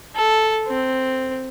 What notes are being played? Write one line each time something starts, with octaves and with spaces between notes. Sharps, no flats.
A4
C4